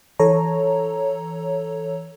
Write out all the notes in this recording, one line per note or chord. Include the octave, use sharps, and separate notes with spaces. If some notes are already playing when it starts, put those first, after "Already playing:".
E3 A4 C#5 A#5